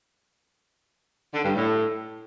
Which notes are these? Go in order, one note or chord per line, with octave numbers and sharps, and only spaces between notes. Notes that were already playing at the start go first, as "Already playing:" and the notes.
D3
G2
A2